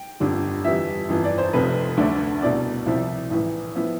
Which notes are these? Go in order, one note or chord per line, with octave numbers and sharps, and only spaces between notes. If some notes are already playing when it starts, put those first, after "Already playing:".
Already playing: G5
G1 F2 D3 G3 D4
F2 E3 G3 E5
G1 F2 E3
D5
C5
F1 F2 C3 F3 B4
D2 D3 A3 D4
C2 B2 A3 D5
C2 C3 F3 C4 E4
A1 A2 E3
A2 F3 B3 E4